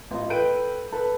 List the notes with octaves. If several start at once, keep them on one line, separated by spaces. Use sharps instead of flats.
A1 F4 D#5
A4 B4 G5 G6 D7 D#7
A4 B4 A5